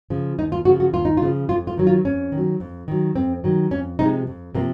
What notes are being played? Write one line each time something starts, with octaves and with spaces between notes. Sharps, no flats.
C#3 F3
D#2 D#4
F4
C#3 F3 F#4
F#4
D#2 F4
D#4
F4
C#3 F3
F2 F4
F4
D#3 F#3
F4
F2 C#4
D#3
F#3
F2
D#3 F#3
F2 C4
D#3 F#3
F2 C#4
C3 F3 G#3 D#4
F2
C3 F3 A#3